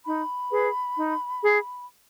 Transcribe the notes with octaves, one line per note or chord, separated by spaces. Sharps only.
D#4 B5
G#4 B4
D#4
G#4